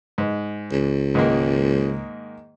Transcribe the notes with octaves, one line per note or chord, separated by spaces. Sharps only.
G#2
C#2
G#2 D#3 A#3